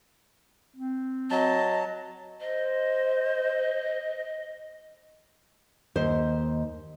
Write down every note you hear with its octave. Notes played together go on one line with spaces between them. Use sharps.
C4
F#3 D#5 A5
C5 D#5
D#2 C5 D#5